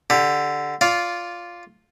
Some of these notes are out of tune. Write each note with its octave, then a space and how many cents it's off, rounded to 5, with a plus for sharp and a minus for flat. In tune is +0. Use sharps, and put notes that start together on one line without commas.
D3 +0 G4 +15
F4 +0 D5 -20 F5 +0